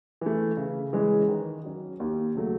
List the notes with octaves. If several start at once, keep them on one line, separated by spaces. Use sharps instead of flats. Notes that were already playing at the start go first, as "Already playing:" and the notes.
E3 A3
C#3
E3 G#3 C#4 G#4
D#3
F#3 C#4
D#2
C#3 F#3 A3